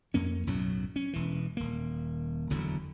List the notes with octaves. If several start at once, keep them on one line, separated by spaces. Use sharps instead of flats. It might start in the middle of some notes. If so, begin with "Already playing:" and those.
F2 A#3 C#4
B1 F#2 A2 F#3
C#4
E1 E3
D#1 A#3
F#1 E2 D3 F#3